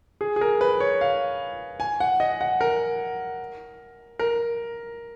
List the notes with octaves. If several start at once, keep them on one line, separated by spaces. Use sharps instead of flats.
G#4
G#4
A#4
B4
C#5
F5
G#5
F#5
D#5
F#5
A#4
A#4